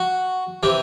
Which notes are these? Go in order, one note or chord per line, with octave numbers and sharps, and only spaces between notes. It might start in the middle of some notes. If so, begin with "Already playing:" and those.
Already playing: F#4
C3 E3 G4